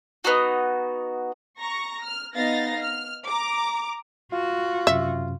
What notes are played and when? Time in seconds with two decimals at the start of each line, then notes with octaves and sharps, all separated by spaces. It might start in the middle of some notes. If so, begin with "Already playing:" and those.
0.24 B3 D#4 F#4
1.60 A#5 C#6 A#6
2.02 F6
2.36 B3 D#4 F5 A6 A#6
2.82 F6
3.26 A#5 D6
4.32 F4 F#4
4.87 F#2 C3 E5